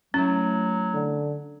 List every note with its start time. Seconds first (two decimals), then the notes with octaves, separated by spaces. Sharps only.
0.14 F#3 A3 C#4 E4 F#4
0.94 D3